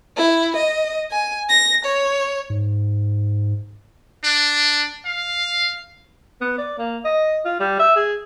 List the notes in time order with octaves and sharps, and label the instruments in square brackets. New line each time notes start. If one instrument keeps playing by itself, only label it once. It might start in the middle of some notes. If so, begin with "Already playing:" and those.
[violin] E4
D#5
G#5
A#6
C#5
[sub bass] G#2
[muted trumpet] D4
F5
[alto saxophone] B3
D5
A#3
D#5
F4
G3
E5
G#4